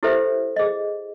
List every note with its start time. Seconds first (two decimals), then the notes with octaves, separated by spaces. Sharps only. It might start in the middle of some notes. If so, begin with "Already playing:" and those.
0.03 E4 G4 A4 B4 C5 E5
0.56 G#4 D#5